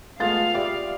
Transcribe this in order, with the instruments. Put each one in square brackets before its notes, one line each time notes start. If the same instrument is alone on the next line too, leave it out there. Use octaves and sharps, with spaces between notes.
[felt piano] G#3 A3 A6 [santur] B3 F4 [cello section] F5
[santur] G3 [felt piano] G4 D5 E5